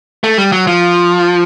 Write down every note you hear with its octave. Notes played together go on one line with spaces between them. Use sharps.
A3
G3
F#3
F3